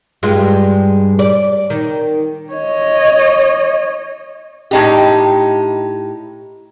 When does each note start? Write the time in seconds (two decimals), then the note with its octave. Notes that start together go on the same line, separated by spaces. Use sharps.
0.23 G2 G#3 F4
1.19 D5
1.70 D#3
2.53 C#5 D#5
4.71 A2 D#4 G4